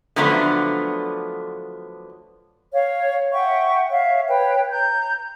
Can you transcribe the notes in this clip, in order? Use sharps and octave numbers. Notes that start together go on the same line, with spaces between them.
D3 F3 F#3 A3 B3 D4
C#5 F5
E5 F#5 G5 C#6
C#5 E5 F5
B4 C#5 G5
A#5 G6